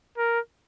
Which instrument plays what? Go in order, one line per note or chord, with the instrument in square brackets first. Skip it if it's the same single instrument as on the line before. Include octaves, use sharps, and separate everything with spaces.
[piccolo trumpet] A#4